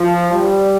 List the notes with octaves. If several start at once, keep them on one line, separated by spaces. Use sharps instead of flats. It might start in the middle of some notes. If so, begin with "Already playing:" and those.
Already playing: F3
G3